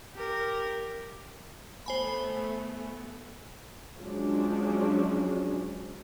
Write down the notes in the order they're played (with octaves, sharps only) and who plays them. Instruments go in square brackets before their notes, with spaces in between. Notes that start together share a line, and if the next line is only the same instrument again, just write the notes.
[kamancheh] G4 A#4
[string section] A3 B3 [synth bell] C5 G#5 B5
[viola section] F3 F#3 G#3 C#4 D4